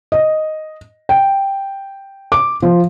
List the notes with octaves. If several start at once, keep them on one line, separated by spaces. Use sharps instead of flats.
D#5
G5
D6
F3